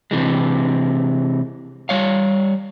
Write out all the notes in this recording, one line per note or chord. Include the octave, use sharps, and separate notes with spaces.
C3 E3 G#3
G3 C#5 F5